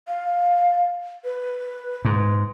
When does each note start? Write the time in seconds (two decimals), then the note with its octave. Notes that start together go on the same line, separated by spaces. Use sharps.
0.08 F5
1.25 B4
2.05 G#2